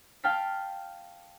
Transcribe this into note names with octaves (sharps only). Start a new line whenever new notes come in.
F5 G5 A5 F6 B6